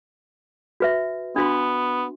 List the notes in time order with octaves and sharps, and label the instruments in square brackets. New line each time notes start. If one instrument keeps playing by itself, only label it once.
[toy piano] F#4 B4 E5
[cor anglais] B3 [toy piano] D4 F#4 C6